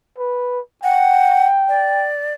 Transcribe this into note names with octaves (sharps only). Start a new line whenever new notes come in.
B4
F#5 G5
D5